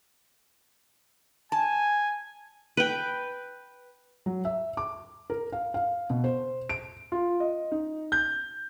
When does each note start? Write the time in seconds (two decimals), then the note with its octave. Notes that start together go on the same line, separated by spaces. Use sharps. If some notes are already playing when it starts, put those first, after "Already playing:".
1.52 G#5 A5
2.77 B4 G5
4.26 F#3
4.45 E5
4.77 D6
5.30 A#4
5.52 F5
5.74 F5
6.10 B2
6.24 C5
6.69 D7
7.12 F4
7.40 D#5
7.72 D#4
8.12 G6